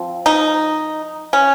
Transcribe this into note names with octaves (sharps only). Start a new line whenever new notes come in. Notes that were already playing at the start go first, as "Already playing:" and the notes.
Already playing: F3 C4
D#4
C#4